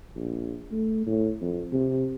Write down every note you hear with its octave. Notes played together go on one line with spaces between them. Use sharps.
A#1
A3
A2
F2
C3